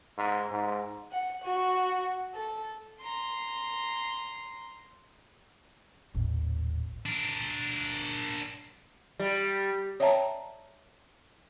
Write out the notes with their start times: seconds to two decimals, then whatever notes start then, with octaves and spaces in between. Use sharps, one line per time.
0.18 G#2
0.52 G#2
1.11 F#5
1.44 F#4
2.33 A4
3.02 A#5 C6
6.15 D#1 A1 D#2
7.06 D4 A#4
9.20 G3
10.00 C#5 D5 E5 G5 A5 A#5